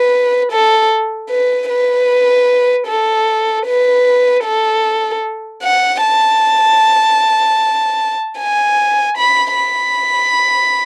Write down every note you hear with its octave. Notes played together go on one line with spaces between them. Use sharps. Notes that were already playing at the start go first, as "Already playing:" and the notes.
Already playing: B4
A4
B4
B4
A4
B4
A4
F#5
A5
G#5
B5
B5